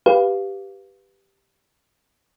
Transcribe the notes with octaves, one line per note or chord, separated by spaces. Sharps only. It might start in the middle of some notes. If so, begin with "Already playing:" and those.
G4 B4 F5